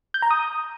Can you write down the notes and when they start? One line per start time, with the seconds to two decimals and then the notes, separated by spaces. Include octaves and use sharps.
0.14 G6
0.22 A#5
0.31 D#6